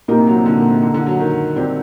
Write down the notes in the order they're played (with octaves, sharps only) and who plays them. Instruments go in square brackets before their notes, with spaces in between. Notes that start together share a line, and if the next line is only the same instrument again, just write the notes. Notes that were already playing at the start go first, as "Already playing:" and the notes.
[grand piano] A#2 [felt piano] A#3 D#4 G4 A#4
[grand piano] C3
F#3
C3
D3
A#2
C3
D3
D3
F#3
D#3
[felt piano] G3 C4 G4 D5